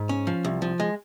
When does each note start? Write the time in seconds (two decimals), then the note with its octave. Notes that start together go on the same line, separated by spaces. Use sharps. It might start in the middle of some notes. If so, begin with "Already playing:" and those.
Already playing: G#2
0.09 C#4
0.27 F3
0.45 C2
0.62 F3
0.80 G#3